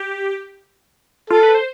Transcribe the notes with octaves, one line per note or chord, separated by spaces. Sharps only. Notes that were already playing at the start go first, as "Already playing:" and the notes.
Already playing: G4
F4 A4
B4
C5